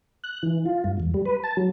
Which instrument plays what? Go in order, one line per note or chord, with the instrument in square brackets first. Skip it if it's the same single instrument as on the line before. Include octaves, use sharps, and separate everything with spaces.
[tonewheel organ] F#6
E3
F4
G2
E2
G3
B4
A5
F#3